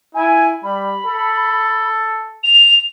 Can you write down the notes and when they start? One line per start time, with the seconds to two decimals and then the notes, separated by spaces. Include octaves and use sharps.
0.15 E4 G#5
0.63 G3 B5
1.07 A4
2.44 F7